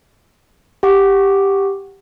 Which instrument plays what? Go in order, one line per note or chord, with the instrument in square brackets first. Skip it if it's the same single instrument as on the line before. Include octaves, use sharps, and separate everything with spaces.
[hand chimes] G4 F#5 D6